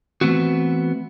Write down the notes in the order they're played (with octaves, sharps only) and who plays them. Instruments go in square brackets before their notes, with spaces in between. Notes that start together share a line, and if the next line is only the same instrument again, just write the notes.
[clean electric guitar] E3 A3 B3 C4 F#4